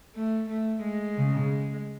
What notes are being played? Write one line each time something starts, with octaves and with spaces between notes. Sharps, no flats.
A3
A3
G#3
C#3